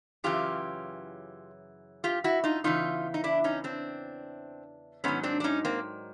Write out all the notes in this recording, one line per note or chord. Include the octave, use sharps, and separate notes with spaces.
F#2 C#3 E3 F4 G4
F4 G4
E4 F#4
D#4 F4
E2 C#3 E3 D#4 F4
D#4
D4 E4
C#4 D#4
C4 D4
G#2 D#3 F#3 B3 C#4
C4 D4
D4
C#4 D#4
A#3 C4